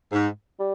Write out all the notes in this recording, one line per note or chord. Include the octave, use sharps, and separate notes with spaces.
G#2
G3